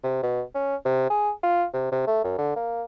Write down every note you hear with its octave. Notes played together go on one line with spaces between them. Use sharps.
C3
B2
C#4
C3
G#4
F4
C3
C3
A3
F#2
D3
A#3